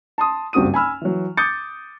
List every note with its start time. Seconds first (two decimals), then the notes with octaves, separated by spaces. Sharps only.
0.18 A5 C6 D#6
0.53 F#1 G2 C4 F#4 D#6 D#7
0.74 G#5 B5 E6 F6
1.02 E3 F#3
1.37 D6 D#6 G6 A6 C#7